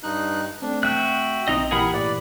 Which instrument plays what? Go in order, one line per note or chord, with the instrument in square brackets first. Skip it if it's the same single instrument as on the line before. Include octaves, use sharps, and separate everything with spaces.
[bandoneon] G2 D#4 F#6
[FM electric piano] A3 C4 [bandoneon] D4
[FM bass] E1 [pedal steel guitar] F#4 F#6 [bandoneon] E5 G5
[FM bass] A#1 [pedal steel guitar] C4 D#4 D#5
[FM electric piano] A#2 E3 G4 [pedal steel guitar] G#4 F#5 B5 [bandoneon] A#4
[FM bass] A2 [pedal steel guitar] B4 [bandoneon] D5